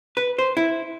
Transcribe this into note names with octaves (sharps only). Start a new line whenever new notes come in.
B4
C5
E4